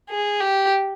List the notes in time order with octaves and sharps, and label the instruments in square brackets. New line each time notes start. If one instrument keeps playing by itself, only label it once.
[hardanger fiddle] G#4
G4